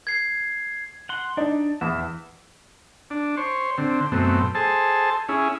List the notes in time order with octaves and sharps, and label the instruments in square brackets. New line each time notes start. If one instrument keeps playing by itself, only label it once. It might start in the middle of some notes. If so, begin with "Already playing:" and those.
[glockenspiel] G#6 C7
[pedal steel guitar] F#5 C6
[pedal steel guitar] D4 [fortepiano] D#4 D5
[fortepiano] E2 [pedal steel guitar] E5
[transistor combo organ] D4
C5 C#5
D3 C4
F#2 B2 A3 C4
G#4 A4 C5 A5
C#4 E4 G#4